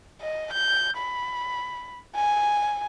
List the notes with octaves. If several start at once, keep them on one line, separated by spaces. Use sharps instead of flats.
D#5
G6
B5
G#5